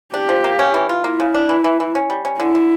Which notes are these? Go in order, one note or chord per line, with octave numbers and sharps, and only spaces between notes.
D4 G4
F3
A#3
C#4
E3
F4
A#3 E4
C#3
D4
E3
E3
E3
C#4
G3
C#4
D3 E4
D3